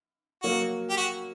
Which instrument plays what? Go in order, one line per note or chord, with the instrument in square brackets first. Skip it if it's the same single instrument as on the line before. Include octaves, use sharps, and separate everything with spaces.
[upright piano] F#3 A#3 [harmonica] F#4
[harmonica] G4
F#4